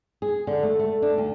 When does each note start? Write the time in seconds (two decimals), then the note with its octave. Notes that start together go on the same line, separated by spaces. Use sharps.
0.22 G#4
0.47 D3
0.63 A3
0.79 A3
1.02 D4
1.18 D2